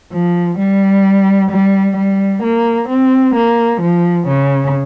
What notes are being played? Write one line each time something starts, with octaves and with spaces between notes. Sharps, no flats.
F3
G3
G3
G3
A#3
C4
A#3
F3
C#3